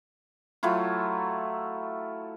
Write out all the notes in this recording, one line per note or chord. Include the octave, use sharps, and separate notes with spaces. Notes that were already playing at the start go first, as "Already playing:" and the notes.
F#3 A3 E4 F4